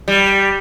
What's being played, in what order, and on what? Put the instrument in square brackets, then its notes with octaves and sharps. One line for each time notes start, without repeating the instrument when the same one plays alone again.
[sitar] G3